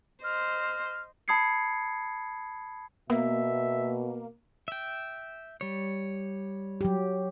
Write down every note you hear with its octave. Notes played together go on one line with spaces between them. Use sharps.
C5 D#5 F6
A5 B5 D#6 G#6 C7 C#7
B2 A#3 B3 E5
E5 G5
G3 C#5
F#3 G4